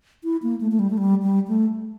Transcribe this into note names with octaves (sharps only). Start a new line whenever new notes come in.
E4
A#3
A3
A3
G3
A3
G3
G3
A3